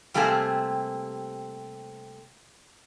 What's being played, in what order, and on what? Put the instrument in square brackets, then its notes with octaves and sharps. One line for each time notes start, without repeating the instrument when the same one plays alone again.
[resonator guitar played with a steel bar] C3 G3 A3 A#3 C4 G#4